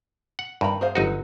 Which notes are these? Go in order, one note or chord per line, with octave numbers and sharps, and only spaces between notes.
F#5
G2 D#3 A#5 B5
G#4 C5 F5
G1 F#3 D#4 F#4